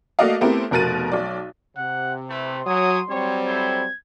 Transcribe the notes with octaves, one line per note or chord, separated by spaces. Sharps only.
A3 A#3 F#4 D5 D#5 F5
A3 B3 C4 E4 G4 A#4
F1 B2 A#4 F#6 A6 D#7
B1 D5
C3 F#5
A3 E4 B4 C6
F#3 G#5 D#6
F#3 G3 C4 C#5
E4 A4 C5 G#6